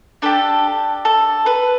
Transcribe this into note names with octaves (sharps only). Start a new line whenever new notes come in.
D4 G4 A4
A4
B4